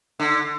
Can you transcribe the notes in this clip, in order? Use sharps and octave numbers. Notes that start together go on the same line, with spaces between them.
D3